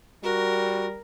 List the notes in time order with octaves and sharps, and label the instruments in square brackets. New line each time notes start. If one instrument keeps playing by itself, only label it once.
[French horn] G3 [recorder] F#4 [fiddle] A#4